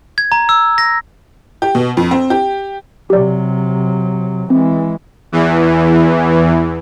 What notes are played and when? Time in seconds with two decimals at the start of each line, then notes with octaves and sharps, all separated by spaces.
0.18 G#6
0.32 A#5
0.49 E6
0.78 A#6
1.62 G4
1.75 B2
1.97 F2
2.11 C4
2.30 G4
3.10 C3 F#3 G4 D5
4.50 E3 G#3 C4
5.32 E2 E3